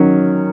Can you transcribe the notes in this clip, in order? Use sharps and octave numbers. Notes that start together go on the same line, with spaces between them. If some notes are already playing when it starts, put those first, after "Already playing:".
Already playing: D#3 F#3 C#4